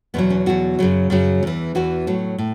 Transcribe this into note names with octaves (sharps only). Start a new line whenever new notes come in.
E2 B2 F#3 B3
C#4
E2 B2 F#3 F#4
F#2 C#3 F#3
F#2 C#3 F#3
E2 E3
E2 E3 F#4
A2 F#3
A2